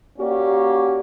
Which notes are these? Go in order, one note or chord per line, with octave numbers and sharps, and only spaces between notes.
A#3 C#4 F#4 G4 D5